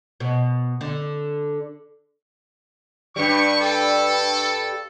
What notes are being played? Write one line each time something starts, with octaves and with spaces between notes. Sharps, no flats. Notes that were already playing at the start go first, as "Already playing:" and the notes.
B2
D3
G2 G3 C#6
A4